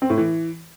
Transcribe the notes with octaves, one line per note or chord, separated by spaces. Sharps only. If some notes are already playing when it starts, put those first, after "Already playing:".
C4
A2
E3